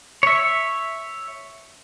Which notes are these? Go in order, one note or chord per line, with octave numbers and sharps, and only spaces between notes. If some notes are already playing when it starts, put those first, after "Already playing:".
C#5 E5